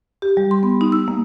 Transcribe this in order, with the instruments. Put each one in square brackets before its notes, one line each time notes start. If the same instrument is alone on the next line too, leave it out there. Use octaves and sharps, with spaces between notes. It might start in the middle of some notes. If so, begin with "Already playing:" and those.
[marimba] G4
G3
C6
B3
D#4
E6
A#3